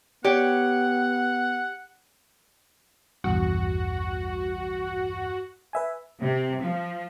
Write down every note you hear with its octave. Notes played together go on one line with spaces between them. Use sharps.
B3 G4 C#5 F#5
A#1 E2 G2 F#4
B4 E5 G#5
C3
F3